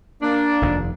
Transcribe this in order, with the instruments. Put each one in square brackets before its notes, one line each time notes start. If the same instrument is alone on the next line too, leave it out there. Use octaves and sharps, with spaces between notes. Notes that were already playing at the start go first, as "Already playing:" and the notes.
[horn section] A#3 D4
[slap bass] F1 D#2